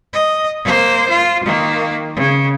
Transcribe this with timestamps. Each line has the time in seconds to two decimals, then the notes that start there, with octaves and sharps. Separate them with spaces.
0.13 D#5
0.63 A#3 C5
1.09 F4
1.44 D#3 A#3
2.16 C#3